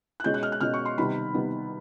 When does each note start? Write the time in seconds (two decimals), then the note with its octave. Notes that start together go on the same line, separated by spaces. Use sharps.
0.20 F#6
0.24 B2 G#3 C#4 G6
0.34 F#6
0.43 F6
0.52 F#6
0.61 B2 G#3 C#4 F6
0.74 C#6
0.85 C6
0.98 C3 D#3 G3 B3 B5
1.34 C3 D#3 G3 B3